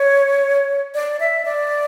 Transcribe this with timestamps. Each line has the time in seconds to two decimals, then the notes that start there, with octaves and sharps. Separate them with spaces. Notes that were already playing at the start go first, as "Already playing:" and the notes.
Already playing: C#5
0.95 D5
1.20 E5
1.45 D5